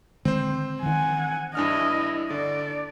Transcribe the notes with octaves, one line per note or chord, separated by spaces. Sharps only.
D3 D#3 G#3 C4 C5
D#3 E3 F#5 G#5
G2 D4 E4 D#5 F6
D3 D5